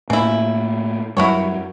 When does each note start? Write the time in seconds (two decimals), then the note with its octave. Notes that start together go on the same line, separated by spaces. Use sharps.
0.10 A2 C#3 A#3 E4
1.17 F#2 F#3 G3 E4 F#4 C#5